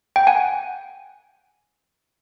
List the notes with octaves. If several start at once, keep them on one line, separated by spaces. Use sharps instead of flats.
G5
F#5 G#5